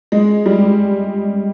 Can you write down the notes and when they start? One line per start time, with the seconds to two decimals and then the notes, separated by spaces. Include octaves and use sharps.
0.12 G#3
0.46 G3